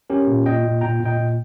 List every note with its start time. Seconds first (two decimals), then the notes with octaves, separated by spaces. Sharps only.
0.10 C#4 G4 A#4
0.27 A#2
0.45 A#2 D#5 G5
0.64 A#2
0.81 A#2 G5 A#5
1.00 A#2
1.05 D#5 G5
1.17 A#2